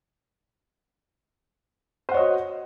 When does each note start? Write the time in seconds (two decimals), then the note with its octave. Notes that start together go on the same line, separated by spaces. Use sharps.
2.09 C5
2.11 F#5
2.14 C#5
2.17 D#5
2.20 F#4